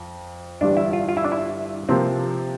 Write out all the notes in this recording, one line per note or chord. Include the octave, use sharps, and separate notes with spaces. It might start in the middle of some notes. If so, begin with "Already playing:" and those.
Already playing: F2
G1 G2 E3 G3 D4
E4
F4
F4
E4
D4
E4
C3 F3 A#3 C4